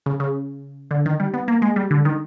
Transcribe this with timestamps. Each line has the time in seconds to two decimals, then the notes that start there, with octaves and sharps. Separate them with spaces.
0.06 C#3
0.20 C#3
0.91 D3
1.06 D#3
1.20 G3
1.34 B3
1.48 A#3
1.62 G#3
1.76 G3
1.91 D3
2.05 D#3